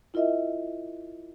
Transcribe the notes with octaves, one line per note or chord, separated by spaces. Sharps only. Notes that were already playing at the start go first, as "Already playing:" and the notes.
E4 F4 A#4 D#5 E5